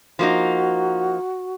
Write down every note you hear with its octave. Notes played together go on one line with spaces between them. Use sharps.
F3 A#3 D#4 F#4